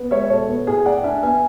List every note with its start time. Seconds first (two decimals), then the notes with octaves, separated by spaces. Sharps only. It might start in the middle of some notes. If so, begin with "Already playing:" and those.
Already playing: B3
0.11 G#3 C#5 E5
0.30 B2 A4 C#5
0.48 B3
0.67 A2 G#4
0.85 A2 D5 F#5
1.04 D4 E5 G#5
1.23 B3 E5 G#5